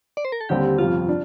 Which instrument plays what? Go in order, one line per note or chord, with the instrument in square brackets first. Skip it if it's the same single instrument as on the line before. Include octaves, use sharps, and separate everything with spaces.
[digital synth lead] D5
C5
A#4
A4
[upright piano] D#2 D3 G3 C4 [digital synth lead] G4
[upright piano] G1 F2 C3 F3 C4 [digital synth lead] F4
[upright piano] D4